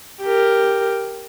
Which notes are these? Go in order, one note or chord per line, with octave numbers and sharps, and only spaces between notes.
G4 A#4